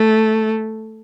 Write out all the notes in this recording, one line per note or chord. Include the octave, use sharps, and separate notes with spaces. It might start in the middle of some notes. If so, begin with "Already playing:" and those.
Already playing: A3